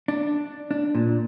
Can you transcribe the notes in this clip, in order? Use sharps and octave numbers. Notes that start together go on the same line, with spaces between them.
D4
D4
A#2